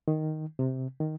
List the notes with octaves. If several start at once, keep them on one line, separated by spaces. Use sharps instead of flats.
D#3
C3
D#3